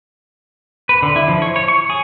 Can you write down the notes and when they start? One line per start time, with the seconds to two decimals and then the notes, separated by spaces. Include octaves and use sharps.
0.89 B4
1.02 D3
1.16 E4
1.28 F3
1.42 C#5
1.56 C#5
1.68 C#6
1.90 G#4